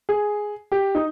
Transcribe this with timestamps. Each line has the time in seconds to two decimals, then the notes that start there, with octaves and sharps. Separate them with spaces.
0.09 G#4
0.72 G4
0.95 D#4